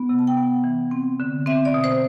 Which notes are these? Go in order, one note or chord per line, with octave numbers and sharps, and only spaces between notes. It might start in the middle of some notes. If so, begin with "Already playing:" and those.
Already playing: B3
C3
A5
G5
B3 F#5
E3
C4
D3
C4 E5
D5
B2
C5